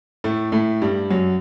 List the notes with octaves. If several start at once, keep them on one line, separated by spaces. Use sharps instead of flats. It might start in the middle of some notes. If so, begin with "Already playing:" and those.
A2 A3
A2 A3
G2 G3
F#2 F#3